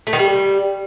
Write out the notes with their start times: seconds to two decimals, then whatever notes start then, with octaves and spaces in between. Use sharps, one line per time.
0.07 A3
0.13 D#3
0.19 G3